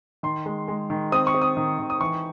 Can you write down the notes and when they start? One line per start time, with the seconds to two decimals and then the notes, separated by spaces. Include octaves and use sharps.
0.23 D#3 C6
0.46 G#3
0.68 G#3
0.90 D#3
1.12 C4 D#6
1.27 C#6
1.34 C4
1.42 D#6
1.57 D#3
1.79 D#3
1.90 D#6
2.00 E3 C#6